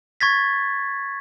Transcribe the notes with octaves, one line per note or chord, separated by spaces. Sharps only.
C#6 G#6 A6 B6